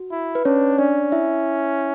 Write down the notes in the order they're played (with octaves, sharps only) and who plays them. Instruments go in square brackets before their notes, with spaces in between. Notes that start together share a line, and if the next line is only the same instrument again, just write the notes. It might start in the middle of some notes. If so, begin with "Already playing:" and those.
Already playing: [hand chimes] F#4
[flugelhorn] E4
[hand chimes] B4
[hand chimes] C#4 C#5 [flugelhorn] D4
[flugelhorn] C#4 [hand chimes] D4 D5
[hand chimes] E4 E5